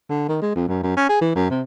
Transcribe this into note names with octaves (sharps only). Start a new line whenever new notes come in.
D3
D#3
G#3
F2
F#2
F#2
C#4
G#4
E3
F#2
C3